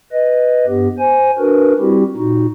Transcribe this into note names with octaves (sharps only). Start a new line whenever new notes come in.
B4 D#5
G2 B3 G4
C5 G#5
D4 F#4 A#4 B4
G3 C4 E4 F#4 G4
A#2 D#4 F#4